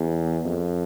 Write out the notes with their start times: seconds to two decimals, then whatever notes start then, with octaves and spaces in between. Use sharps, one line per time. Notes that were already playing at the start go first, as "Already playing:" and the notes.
Already playing: E2
0.45 F2